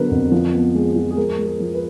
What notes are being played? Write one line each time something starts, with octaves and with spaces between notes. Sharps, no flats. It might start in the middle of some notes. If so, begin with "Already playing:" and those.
Already playing: D3 F#3 B3 A#4 B4
F2
F3
B3
G#3
F3
G#4
G#3 A#4
G#3
G#4
F3
B4